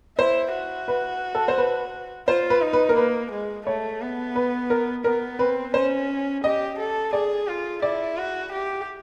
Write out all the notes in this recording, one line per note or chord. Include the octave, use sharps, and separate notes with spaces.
E4 C5
F#4
B4
A4
C5
B4
F4 C5
B4
D#4
B4
A#4
A#3 B4
G#3
A3 C#5
B3
B4
A#4
B3 A#4
C4 B4
C#4 C5
G4 D#5
A4
G#4 D5
F4
E4 D5
F#4
G4